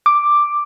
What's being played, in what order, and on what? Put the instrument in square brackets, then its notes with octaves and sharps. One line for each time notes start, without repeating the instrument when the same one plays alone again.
[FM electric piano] D6